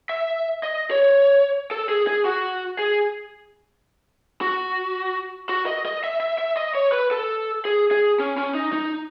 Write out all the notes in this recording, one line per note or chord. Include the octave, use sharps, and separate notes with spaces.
E5
D#5
C#5
A4
G#4
G#4
F#4
G#4
F#4
F#4
D#5
D#5
E5
E5
E5
D#5
C#5
B4
A4
G#4
G#4
C#4
C#4
D#4
D#4